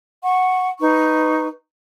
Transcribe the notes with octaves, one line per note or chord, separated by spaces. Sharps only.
F#5 C#6
D#4 B4 C#6